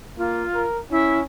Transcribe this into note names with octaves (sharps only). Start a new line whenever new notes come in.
A#3 F4
A#4
C#4 E4